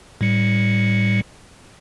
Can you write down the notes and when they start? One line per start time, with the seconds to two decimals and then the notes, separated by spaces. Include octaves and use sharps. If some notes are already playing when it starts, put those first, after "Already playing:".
0.21 A2 G3 C#7